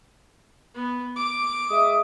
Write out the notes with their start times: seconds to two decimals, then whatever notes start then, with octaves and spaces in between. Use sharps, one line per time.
0.75 B3
1.16 D6
1.70 G#3 E5 D#6